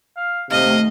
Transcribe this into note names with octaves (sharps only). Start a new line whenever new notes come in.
F5
D#2 C3 A3 D#5 F5